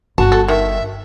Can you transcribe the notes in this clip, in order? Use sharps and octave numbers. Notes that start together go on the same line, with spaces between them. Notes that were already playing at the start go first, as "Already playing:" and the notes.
G1 F#4 A5
A4
D#3 E5